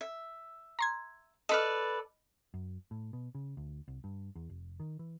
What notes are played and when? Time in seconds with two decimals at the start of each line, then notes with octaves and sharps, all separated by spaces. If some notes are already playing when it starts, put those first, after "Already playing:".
0.01 E5
0.79 A#5 C6 G#6
1.49 A4 B4 D5 D#5 B5 F6
2.54 F#2
2.91 A2
3.13 B2
3.35 C#3
3.57 D2
3.88 C2
4.04 G2
4.35 E2
4.49 F1
4.80 D#3
4.99 E3